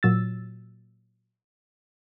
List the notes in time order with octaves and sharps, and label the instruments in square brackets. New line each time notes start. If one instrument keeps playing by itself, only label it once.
[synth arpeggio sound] A#2 F#3 E6 A6